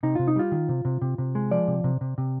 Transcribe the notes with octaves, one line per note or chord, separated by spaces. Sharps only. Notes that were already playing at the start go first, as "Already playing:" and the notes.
C3 D#4
C3 F4
D#4
G3 F4
D#3
C3
C3
C3
C3
G#3
F3 D5
C3
C3
C3
C3